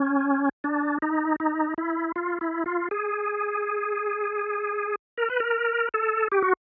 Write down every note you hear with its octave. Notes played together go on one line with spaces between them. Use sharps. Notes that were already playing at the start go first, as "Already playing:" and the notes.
Already playing: C#4
D4
D#4
D#4
E4
F4
E4
F4
G#4
A#4
B4
A#4
A4
G4
F#4